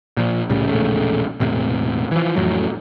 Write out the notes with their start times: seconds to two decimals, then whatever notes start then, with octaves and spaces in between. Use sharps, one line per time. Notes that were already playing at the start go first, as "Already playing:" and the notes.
0.17 A#2 F3
0.49 C2 A2 C#3 G3
0.68 E1 A#1 C#3 A3
1.40 E1 A2 C3
2.11 E3 F3
2.36 A1 F2 A2 F#3